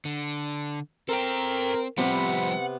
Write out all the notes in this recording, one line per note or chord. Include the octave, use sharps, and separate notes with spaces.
D3
C4 A4 A#4 G5
C3 F3 G3 B3 C4 F#5 B5